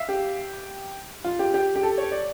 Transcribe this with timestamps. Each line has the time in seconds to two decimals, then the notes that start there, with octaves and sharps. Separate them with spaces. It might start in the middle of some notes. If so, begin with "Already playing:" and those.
Already playing: E5 F5
0.09 G4
1.25 F4
1.39 G4
1.54 G4
1.76 G4
1.83 A4
1.98 C#5
2.12 D5